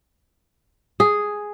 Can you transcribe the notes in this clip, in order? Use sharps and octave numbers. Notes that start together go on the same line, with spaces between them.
G#4